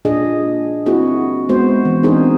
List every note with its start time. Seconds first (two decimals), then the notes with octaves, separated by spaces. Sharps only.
0.05 A#2 D4 G#4 D#5
0.86 A#3 C4 E4 F#4 G#4
1.49 G#3 B3 F#4 C5
1.85 E3
2.03 C4 D4 D#4 G#4 A#4 C5